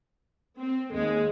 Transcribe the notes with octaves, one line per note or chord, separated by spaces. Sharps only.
C4
D#2 G#3